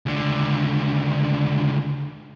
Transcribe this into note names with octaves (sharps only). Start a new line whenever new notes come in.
C#2 D3